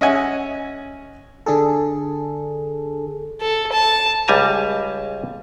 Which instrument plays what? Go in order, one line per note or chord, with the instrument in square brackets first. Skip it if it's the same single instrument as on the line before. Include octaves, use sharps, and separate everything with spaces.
[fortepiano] C#4 D#5 E5 F#5 G#5
[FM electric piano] D3 D4 G#4 A4
[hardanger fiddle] A4
A5
[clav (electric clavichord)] C#2 G3 G#5 A#5